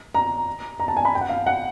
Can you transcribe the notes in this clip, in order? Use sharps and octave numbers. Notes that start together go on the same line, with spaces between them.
A#5
A#5
A5
G#5
B5
G5
F#5
F5
F#5